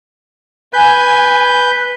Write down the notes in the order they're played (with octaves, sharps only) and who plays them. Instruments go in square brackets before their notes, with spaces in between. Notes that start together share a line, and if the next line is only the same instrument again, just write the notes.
[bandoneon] B4 G6 [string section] G#5